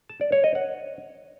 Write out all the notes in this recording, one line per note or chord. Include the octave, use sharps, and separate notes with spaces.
A5
D5
C#5
D#5
F#5